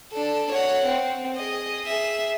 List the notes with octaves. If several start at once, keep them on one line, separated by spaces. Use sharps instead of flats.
D4 A4
C#5 F#5
C4
G#4 D#5
G#4 E5